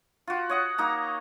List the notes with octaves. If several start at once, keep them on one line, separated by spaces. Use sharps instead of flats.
F4 F#4
C#5 D#5 F#5
A#3 D#4 A#5